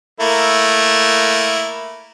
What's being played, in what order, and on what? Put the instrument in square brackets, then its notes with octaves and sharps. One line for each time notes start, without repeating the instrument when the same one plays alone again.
[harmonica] A3 A#3 E4